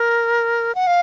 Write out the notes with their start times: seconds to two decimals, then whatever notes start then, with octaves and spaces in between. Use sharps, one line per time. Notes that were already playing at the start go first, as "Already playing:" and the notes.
Already playing: A#4
0.75 F#5
0.87 F5